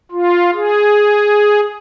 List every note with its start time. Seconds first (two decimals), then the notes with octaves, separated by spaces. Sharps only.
0.12 F4
0.54 G#4